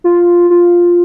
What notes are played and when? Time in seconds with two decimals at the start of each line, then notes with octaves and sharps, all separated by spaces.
0.04 F4
0.50 F4